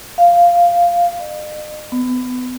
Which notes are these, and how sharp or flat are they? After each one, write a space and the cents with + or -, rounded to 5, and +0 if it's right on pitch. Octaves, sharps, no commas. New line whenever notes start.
F5 -5
D#5 -45
B3 +25